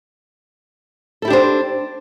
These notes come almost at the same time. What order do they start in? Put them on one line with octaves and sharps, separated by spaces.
A4 E4 G4 D4 C5